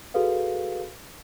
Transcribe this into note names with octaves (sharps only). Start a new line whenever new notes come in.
F#4 G#4 A4 B4 F5